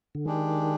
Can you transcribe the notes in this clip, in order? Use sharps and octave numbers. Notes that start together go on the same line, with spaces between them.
D3
D#3 G#3 D4 G4